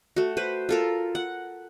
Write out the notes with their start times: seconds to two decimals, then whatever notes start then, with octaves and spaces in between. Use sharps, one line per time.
0.16 A3 F#4
0.37 B4 C5
0.69 F4 A4 A#4
1.15 F#5